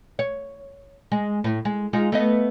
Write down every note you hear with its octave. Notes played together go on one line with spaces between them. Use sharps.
C#5
G#3
A2
G#3
G#3 D#4 F4
A3 B3 D#5